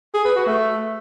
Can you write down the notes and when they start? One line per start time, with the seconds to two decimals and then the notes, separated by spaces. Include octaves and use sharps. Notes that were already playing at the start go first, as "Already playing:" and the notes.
0.14 G#4
0.25 B4
0.36 F#4
0.47 A3